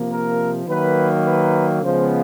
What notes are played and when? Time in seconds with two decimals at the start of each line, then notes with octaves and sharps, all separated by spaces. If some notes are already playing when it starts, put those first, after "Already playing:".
Already playing: C3 F3 A#3
0.09 A#4
0.67 D#3 F#3 A#3 B4
1.25 B4
1.83 C#3 F3 G#3 B3 C5